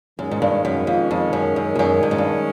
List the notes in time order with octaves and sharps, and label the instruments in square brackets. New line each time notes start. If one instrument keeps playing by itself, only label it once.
[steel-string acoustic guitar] F#2 [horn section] D#3 G#3 C#4
[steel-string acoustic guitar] G#2
G2
F#2
F2
F2
F#2
F#2
F2
F#2
G2
G#2
G2